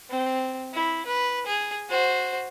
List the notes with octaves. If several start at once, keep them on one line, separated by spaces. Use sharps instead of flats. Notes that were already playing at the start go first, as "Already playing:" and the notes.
C4
E4
B4
G#4
F#4 C5